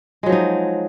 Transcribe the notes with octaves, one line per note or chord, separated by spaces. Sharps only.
F3 F#3 G#3 D#4